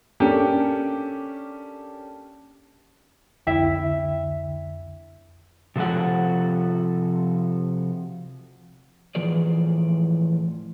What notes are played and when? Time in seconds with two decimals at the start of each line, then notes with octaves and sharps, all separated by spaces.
0.20 A#3 C#4 D4 G4 A4
3.47 C2 F2 D3 B3 E4 E5 G5
5.76 C3 F3 F#4 A4 F#5
9.15 A2 E3 F3 G#4 D5